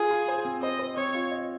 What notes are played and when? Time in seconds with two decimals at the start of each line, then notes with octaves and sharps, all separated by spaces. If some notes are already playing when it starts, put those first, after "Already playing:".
Already playing: F4 G#4
0.11 F4
0.28 C5
0.45 C4
0.62 C5 D#5
0.79 C5
0.97 C4 C#5
1.14 F4
1.31 D#5